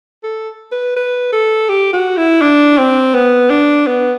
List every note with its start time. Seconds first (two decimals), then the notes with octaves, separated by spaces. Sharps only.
0.24 A4
0.72 B4
0.97 B4
1.33 A4
1.69 G4
1.93 F#4
2.17 E4
2.41 D4
2.78 C4
3.15 B3
3.50 D4
3.87 B3